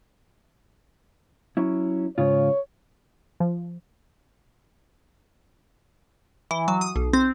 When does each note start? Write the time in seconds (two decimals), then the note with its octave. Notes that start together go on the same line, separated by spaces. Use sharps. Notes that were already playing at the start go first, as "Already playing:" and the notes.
1.57 F#3 C#4 E4
2.18 G#2 C#3 F4 C#5
3.40 F3
6.51 E3
6.68 F#3
6.81 D#6
6.96 B1
7.13 C4